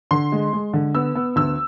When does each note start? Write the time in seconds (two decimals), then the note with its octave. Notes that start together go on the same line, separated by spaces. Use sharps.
0.11 D3 C6
0.32 G#3
0.53 G#3
0.73 D3
0.95 B3 E6
1.15 B3
1.36 D2 E6